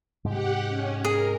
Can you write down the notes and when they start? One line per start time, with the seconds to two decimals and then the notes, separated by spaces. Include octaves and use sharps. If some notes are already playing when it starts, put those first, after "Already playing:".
0.25 G#2 C3 G#3 G4 F#5
0.68 C#4
1.05 G#4 A#4